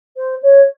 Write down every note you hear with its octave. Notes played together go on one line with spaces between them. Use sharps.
C5
C#5